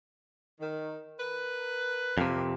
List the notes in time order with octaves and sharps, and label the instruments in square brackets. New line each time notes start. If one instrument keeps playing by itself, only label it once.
[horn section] D#3
A#4 B4
[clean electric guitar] F2 C3 [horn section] A#3